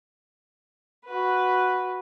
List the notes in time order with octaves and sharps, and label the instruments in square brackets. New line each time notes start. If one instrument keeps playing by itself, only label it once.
[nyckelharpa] F#4 B4